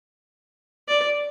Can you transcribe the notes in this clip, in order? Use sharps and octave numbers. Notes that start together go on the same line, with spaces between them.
D5